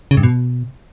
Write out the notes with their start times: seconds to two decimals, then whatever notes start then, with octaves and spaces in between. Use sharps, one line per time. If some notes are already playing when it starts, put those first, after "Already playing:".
0.11 C#3
0.17 G2
0.23 B2